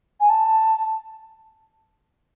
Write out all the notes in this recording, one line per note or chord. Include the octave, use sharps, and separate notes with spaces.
G#5
A5